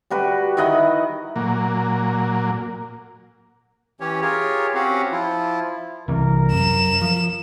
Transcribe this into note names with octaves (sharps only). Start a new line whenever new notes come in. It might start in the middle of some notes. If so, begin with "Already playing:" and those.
G3 F#4 B4
D#3 E4 D#5 F#5
A#2 F#3 A#3
E3 C#4 G4 C#5
F4 G4 G#4 A#4 C#5
C4 C#4 F#4 G4 F5 F#5
F3 E4 F4
C2 E3 A#4
F#2 E7
F3